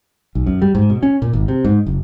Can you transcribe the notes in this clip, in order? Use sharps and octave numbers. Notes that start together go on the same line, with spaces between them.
B1
F#2
G3
G#2
B2
C#4
A#2
G#1
C3
G#2
F#1